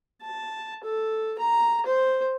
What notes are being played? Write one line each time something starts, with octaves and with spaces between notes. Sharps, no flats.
A5
A4
A#5
C5